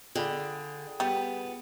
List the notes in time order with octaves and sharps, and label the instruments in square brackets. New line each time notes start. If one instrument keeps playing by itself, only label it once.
[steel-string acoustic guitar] D3 [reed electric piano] F4 D5 B5 [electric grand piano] G#4 G5
[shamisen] G3 [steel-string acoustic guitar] B3